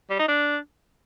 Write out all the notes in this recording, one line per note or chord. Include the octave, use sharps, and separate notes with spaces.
G3
D#4
D4